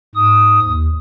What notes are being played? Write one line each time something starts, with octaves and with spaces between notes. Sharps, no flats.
G#2 D#6
D#2